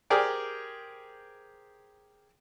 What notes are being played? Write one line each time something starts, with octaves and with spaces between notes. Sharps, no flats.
G4 G#4 A#4 C5 D5 G5